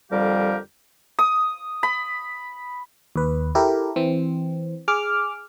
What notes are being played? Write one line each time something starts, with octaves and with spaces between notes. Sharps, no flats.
F2 D3 G3 G4 A#4 F5
D#6
B5
D#2 B4
E4 G4 A4 A#4
E3 C4
G#4 D6 F6